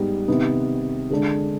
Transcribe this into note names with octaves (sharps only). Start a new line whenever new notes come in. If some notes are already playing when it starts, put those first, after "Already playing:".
Already playing: G#2 G3 B3 D#4
C3 D#3 B3
D3 G#3 D4